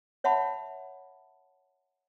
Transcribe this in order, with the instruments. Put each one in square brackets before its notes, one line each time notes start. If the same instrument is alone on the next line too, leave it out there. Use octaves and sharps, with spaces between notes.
[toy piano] C#5 E5 F#5 A5 B5